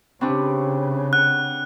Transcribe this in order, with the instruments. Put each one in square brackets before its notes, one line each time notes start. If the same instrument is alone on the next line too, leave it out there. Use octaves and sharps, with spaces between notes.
[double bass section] C#3 [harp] C4 D4 [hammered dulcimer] G4 B4 C#6
[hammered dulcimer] F#5 [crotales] F#6